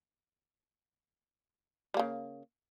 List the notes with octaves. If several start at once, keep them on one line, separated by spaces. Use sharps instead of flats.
C#3 G3 A#3